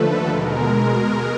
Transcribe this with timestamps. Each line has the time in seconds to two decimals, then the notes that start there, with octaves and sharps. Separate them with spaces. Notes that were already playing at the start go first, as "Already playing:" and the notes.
Already playing: D#2 D3 F3 A3 A4 B4
0.29 B2 G#3 A#4